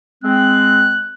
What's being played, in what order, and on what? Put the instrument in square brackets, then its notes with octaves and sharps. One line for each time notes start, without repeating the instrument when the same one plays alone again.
[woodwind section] G#3 C4 [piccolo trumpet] F#6